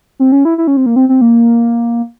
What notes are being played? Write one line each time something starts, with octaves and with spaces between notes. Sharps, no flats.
C4
C#4
E4
E4
C#4
C4
A#3
C4
C4
A#3